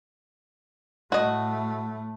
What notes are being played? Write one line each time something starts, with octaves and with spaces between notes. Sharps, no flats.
A2 A3 F#4 D#5